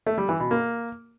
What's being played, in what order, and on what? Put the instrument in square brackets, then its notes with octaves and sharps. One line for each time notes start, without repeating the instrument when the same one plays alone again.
[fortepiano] A3
G3
E3
B2
A#3